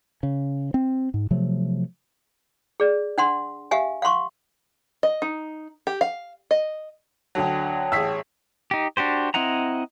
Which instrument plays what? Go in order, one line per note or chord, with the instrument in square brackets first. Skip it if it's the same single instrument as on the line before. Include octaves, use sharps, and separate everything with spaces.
[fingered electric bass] C#3
C4
G#2
C3 F3 F#3 A3
[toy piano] G#4 D5
D4 F#5 C6
G4 E5 F5 G#5
F5 F#5 C6 C#6
[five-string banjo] D#5
D#4
G4
F5
D#5
[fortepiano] D2 D3 F#3 [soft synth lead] C#5 [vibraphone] F#5 G5 A5
[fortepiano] A1 G#4 [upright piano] E6 B6
[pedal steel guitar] D#4 G4
D4 F#4 G4 C5
C4 E4 D#5 F#5 A#5